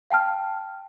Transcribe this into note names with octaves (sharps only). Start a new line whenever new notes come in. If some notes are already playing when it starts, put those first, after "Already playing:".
F5 G5 A5 F6